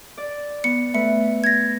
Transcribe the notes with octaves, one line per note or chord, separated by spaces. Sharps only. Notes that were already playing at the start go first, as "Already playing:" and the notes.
D5
B3 C#7
A3 B4 E5 C#7
G#6 A#6